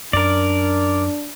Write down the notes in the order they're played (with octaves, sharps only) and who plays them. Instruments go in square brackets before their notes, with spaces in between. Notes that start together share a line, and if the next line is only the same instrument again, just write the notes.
[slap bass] F#2 [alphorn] D4 [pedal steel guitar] A#4 D5